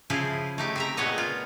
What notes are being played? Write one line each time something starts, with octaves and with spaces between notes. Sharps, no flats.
C#3 F3 E4 G#4 C5
A3 D#4 G4
C4 E5 A#5
A#2 G#3 B3 C#5 D#5
F4